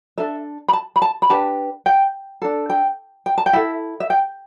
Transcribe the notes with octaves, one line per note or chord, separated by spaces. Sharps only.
D4 A4 E5
B5
A5
B5
A5
B5
D4 G4 B4 A5
G5
D4 A4
G5
G5
A5
G5
E4 A4 E5
E5
G5